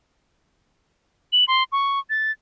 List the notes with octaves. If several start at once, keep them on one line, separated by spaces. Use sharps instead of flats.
F#7
C6
C#6
A6